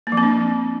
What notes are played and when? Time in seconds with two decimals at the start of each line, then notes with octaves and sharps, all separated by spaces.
0.07 A#3
0.12 F3
0.17 C4
0.23 D4